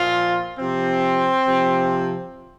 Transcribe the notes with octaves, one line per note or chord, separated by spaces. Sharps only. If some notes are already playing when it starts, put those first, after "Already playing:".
Already playing: A#2 F3 F4
C3 F3 C4
C3 F3